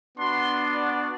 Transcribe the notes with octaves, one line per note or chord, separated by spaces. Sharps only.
B3 D4 F#4 C6
D5